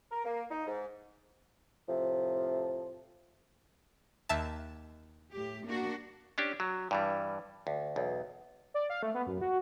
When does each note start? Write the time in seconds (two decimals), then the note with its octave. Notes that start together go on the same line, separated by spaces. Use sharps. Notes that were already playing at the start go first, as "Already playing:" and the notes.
0.10 A#4
0.24 A#3
0.50 D#4
0.67 G#2
1.88 A2 C3 F3
4.29 D#2 E5 A5
5.32 A2 G4
5.65 A#3 D4 F#4
6.38 C#4 D4 G4
6.60 F#3
6.91 G2 E3 G3
7.67 D2
7.96 B1 E2
8.74 D5
8.90 F5
9.03 A3
9.14 B3
9.27 F#2
9.41 F#4